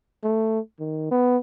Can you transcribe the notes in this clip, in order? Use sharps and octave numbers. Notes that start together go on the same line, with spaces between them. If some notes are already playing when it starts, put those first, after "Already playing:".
A3
D#3
B3